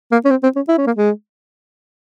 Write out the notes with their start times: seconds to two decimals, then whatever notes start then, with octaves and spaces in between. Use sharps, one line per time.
0.12 A#3
0.25 C#4
0.30 C4
0.43 C4
0.56 C#4
0.68 E4
0.78 C#4
0.86 A#3
0.96 G#3